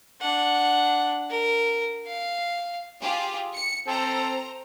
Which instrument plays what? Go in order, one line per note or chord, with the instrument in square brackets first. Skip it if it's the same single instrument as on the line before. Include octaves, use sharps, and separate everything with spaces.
[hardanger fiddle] D4 F#5
A#4
F5
[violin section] F4 G4 G#4
C#7
[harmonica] C4 A4 [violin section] C5 A#5